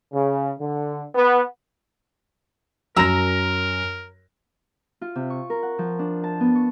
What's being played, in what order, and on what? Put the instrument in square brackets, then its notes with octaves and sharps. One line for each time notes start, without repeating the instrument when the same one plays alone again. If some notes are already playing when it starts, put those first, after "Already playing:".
[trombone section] C#3
D3
B3
[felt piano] F#2 A#6 [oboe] A#4 [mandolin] A#5 E6
[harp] F4
C3
C#6
A#4
F#5
F3
D4
A5
B3
C#6